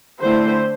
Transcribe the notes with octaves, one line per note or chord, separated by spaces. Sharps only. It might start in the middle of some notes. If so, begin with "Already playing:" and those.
D3 A3 C4 E4 C5